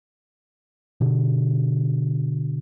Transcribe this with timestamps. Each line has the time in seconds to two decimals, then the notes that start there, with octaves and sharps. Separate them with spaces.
1.01 B2 D3